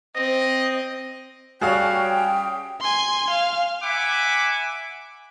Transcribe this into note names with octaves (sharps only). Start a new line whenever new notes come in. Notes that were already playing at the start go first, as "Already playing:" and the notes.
C4 D#5
G3 C#4 F#4 G#4 F5 G5
G#5 C6
F5
E5 F#5 G#5 B5 D6